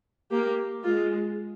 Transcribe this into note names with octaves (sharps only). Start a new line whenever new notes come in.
A#3 G4
G#3 F4